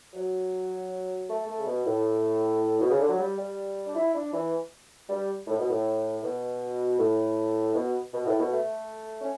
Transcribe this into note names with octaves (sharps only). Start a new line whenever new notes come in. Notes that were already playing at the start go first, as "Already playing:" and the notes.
F#3
A3
A3
C#3
B2
A2
B2
C#3
D3
F#3
G3
G3
D4
E4
D4
E3
G3
A2
B2
A2
B2
A2
B2
B2
A2
B2
A3
C#4